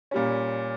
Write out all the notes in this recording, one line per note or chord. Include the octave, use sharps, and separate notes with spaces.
A#2 G3 C#4